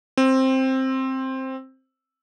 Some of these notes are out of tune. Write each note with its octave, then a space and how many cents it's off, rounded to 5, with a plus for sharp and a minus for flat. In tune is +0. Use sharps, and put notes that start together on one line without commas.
C4 +10